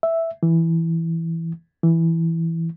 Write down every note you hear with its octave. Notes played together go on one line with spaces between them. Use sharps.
E5
E3
E3